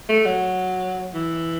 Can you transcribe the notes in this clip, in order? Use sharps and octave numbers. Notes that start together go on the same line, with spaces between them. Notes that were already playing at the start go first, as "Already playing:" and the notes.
A3
F#3
E3